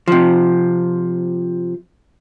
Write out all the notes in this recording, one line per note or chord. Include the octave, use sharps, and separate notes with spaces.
C3 F3